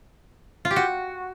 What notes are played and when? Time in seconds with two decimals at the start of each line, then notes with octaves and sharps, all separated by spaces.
0.65 F4
0.71 G4
0.76 F#4